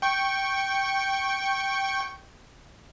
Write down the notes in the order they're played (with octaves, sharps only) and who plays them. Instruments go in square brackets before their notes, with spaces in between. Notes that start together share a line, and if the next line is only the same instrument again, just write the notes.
[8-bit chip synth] G5 C#6